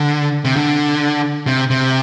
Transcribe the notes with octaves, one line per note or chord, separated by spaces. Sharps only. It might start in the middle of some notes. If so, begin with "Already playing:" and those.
Already playing: D3
C3
D3
C3
C3